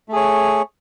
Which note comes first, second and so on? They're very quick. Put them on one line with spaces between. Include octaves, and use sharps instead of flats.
A3 G#4 C#5